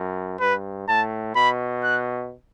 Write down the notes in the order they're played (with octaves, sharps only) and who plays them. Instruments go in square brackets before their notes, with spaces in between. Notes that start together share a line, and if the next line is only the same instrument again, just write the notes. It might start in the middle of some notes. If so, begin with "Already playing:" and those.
Already playing: [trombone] F#2
[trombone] G2 [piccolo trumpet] B4
[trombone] A2 [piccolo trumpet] A5
[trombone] B2 [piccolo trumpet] B5
[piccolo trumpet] F#6